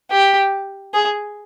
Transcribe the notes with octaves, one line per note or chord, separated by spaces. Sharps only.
G4
G#4